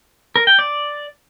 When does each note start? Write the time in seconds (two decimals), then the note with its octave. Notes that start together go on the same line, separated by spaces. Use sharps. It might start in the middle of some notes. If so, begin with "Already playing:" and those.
0.36 A#4
0.47 G5
0.59 D5